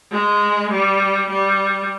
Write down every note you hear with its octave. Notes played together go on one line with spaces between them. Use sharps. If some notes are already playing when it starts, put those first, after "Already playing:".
G#3
G3
G3